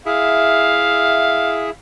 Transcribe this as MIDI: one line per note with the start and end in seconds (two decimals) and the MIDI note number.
0.06 1.70 64
0.06 1.70 68
0.06 1.70 76
0.06 1.75 77